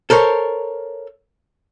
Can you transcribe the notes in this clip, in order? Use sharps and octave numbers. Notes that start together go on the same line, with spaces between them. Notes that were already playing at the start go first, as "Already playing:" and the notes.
A4 A#4 C5 C#5